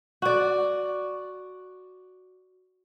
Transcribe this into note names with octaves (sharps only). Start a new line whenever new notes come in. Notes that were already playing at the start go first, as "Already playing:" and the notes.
F#4 D5